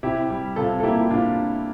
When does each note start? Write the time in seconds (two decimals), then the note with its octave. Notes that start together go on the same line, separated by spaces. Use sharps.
0.03 C3 E4 G4
0.30 G3
0.56 C3 F4 A4
0.80 A4
0.83 A#3 E4 G4
1.01 E4
1.10 C3 D4 F4